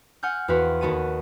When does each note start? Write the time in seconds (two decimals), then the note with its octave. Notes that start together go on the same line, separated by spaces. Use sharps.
0.23 F#5 G#5 F6 G6
0.48 E2 C4 F#4 B4 F5
0.81 D#2 B3 F#4 A5 D#7